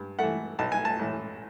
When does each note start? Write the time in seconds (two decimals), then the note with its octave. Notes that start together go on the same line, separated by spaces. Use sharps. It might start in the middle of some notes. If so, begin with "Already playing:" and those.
Already playing: G2
0.19 E3 A3 F#5
0.59 B1 A5
0.72 G#5
0.85 A5
0.99 A2 E3